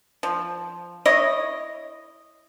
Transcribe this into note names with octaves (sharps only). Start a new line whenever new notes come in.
F3
E4 C#5 D#5